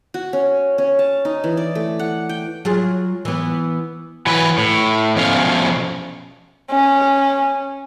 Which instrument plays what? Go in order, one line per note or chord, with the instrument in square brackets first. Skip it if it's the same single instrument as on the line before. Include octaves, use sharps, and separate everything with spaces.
[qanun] F#4
C#4
C#4
A5
D#4
E3
D5
A3
F#5
G5
[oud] F#3 F4 G#4
E3 B3
[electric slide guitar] E3 F#3 B4
A2
B2 F3 A3 C#4 F5
[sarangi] C#4